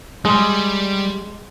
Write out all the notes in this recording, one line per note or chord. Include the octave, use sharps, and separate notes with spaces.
G3 G#3